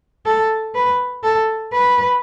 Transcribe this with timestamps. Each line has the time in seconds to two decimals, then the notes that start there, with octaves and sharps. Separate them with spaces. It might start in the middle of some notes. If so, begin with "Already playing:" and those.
0.26 A4
0.75 B4
1.23 A4
1.73 B4